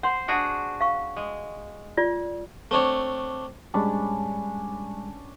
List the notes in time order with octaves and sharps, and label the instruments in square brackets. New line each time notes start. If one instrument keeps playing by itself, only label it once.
[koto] C5 [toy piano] F#5 C6
[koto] D4 F#4 G#4
[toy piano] F5 C#6
[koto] G#3
[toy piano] F4 D5
[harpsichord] A3 C4 D4 C#5
[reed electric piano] A2 G3 G#3 [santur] C#4 D4 B5